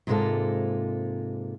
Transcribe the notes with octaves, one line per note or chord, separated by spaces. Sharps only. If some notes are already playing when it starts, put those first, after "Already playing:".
G#2 C3 G#3 A#3 F4 A4